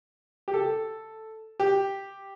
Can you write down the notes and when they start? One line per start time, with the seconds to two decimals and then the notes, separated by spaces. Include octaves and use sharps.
0.48 G4
0.54 A4
1.60 G4